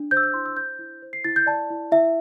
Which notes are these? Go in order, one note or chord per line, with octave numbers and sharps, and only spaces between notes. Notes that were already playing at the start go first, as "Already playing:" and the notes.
Already playing: D4
C5 G6
E6
G6
E4 C6
E6
C5 G6
E4
C5
C7
E4 A6
G6
D5 A5
E4
E4 E5